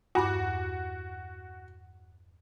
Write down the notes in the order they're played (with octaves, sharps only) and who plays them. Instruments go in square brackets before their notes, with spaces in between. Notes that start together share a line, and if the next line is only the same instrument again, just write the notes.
[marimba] E2 G2 D6 [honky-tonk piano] F#4